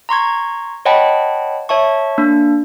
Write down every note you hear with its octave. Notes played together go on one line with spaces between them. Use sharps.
A#5 C6 C#6 G#6
C#5 D#5 F#5 G5 A5 B5
C#5 E5 A5 C#6
A#3 D4